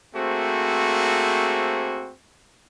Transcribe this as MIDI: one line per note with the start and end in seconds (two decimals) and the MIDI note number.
0.15 2.13 57
0.15 2.13 58
0.15 2.13 60
0.15 2.13 66
0.15 2.13 68
0.15 2.13 72